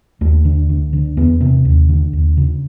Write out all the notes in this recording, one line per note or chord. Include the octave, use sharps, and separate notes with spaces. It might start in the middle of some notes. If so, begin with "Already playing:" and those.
D#2 A3
D3
D2
D3
E2 B3
C3 C4
D#2
D3
D#2
C#3